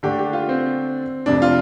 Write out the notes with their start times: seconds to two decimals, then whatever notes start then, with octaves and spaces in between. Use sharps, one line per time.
0.03 D3 A3 D4 G4
0.19 G4
0.33 F4
0.49 C4
1.26 F1 F2 C3 D4
1.42 F4